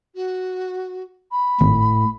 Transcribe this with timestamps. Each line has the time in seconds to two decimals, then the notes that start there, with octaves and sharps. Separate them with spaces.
0.15 F#4
1.32 B5
1.61 G#1 A2